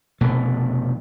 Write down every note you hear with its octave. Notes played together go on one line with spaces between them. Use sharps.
F1 B2 A3